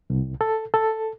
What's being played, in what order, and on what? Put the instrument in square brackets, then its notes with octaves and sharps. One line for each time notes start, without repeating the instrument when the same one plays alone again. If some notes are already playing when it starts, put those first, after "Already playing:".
[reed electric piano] C2
A4
A4